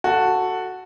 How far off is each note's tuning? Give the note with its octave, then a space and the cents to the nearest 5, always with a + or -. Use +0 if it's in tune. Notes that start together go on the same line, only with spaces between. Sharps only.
F#4 +0 A4 +10